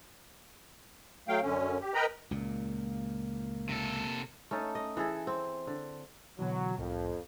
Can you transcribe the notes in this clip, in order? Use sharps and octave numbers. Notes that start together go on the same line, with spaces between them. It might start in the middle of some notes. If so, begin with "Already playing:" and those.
F#3 A3 F5 G5
F#2 D3 C#4
G4
A#4 B4 D#5 G5 A#5 B5
C#2 A#2 A#3
C3 A4
A3 C#4 D#4 A4
D#5
E3 G#4 A4
C4
D3
B2 D3 E3 F#3
C2 F2 A2